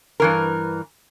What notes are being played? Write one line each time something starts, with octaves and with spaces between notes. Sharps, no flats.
G2 E3 A#4